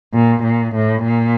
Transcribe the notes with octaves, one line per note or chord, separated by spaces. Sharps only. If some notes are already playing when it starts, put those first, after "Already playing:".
A#2
A#2
A2
A#2